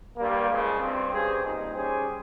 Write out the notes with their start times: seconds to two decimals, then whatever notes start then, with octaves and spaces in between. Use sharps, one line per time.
0.18 G2 G3 A#3
0.49 C#3 F3 G#3
0.81 G2 G3 C4
1.12 G2 G3 C#4 G#4 C5
1.44 A#2 G3 C4 D#4
1.74 G3 C#4 G#4 C5